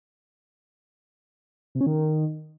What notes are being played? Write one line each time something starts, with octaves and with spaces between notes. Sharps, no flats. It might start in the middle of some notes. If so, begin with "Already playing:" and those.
C3
C#4
D#3